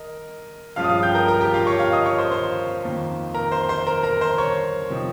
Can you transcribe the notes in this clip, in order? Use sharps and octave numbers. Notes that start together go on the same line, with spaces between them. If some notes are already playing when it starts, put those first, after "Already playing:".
Already playing: A#4 D#5
G2 F3 G#3 C#4 F4 F5 F6
D#6
F5 F6
G5 G6
A#4 A#5
A#4 A#5
G4 G5
F4 F5
C#5 C#6
F5 F6
D#5 D#6
C#5 C#6
C5 C6
C5 C6
F2 D#3 A#3 F4
A#4 A#5
C5 C6
C5 C6
A#4 A#5
A#4 A#5
C5 C6
C#5 C#6
C3 F3 C4 D#4